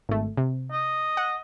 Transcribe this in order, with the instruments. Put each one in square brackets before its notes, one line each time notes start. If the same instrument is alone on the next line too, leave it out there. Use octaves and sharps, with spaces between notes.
[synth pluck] G#1 A3
C3
[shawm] D#5
[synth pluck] F#5